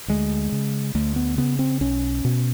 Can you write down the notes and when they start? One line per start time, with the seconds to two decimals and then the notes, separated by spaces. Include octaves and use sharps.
0.08 D2 G#3
0.52 C#3
0.95 D2 A3
1.16 B3
1.38 C#3 B3
1.59 C4
1.80 B1 C#4
2.25 B2